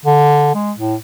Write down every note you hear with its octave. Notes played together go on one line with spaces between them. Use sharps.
D3
G#3
A2